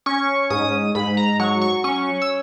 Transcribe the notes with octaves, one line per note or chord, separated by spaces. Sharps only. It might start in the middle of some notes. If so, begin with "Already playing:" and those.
C#4 C#6
G#2 D#6
G#2 B5
A#5
F#3 C#6
C#6
C#4 C#6
E6